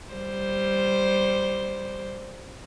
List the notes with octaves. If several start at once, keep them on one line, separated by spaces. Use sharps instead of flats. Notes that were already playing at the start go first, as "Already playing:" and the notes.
G3 C5